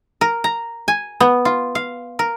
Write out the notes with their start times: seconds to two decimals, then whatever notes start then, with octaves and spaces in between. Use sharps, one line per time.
0.21 A#4
0.44 A#5
0.88 G#5
1.20 B3
1.45 F4
1.75 F5
2.19 A#4